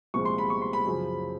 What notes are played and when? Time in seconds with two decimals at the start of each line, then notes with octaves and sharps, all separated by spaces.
0.14 C2 A#2 F3 G#3 C#6
0.25 C6
0.38 B5
0.50 C#6
0.62 C6
0.73 B5
0.86 F#2 C#3 F3